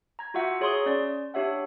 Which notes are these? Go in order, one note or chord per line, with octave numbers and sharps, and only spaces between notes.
A#5 G#6
F4 F#4 E5 F#5
G#4 C#5 E5 A#5 C6 D#6
C#4 D5
D4 G4 C#5 E5 F#5